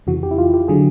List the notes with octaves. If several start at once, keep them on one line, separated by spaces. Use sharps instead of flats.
F2 C#3 E3 F#4
G4
E4
F4
G4
D3 F#3 G#4